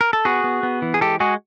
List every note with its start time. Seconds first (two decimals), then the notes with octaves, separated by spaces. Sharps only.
0.01 A#4
0.13 A4
0.25 B3 F#4 G#4
0.44 B3
0.63 B3
0.82 E3
0.94 G#4
1.01 G#3 G4 A4
1.20 G#3 F#4 G#4